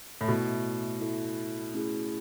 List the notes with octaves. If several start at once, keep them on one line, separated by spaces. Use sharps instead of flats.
A2
B2 A3 E4 A4 E5
A3 E4 A4 E5
A3 C#4 E4 G#4